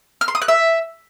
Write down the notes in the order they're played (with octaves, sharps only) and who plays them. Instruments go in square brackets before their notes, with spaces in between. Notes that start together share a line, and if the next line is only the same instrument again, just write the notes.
[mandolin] F6
C6
D#6
F#6
E5